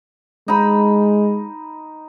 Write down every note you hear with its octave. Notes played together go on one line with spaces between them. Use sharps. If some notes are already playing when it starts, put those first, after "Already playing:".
G#3 D#4 B5